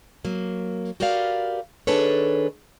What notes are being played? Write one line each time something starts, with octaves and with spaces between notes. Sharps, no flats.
F#3 A#3
F#4 G4 A#4 B4 D5 F5
D#3 D4 G#4 A4 B4 C#5